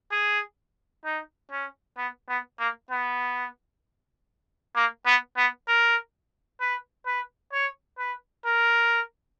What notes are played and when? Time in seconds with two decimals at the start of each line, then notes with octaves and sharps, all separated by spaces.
0.12 G#4
1.05 D#4
1.51 C#4
1.97 B3
2.29 B3
2.59 A#3
2.90 B3
4.76 A#3
5.06 B3
5.37 B3
5.68 A#4
6.61 B4
7.06 B4
7.52 C#5
7.98 B4
8.45 A#4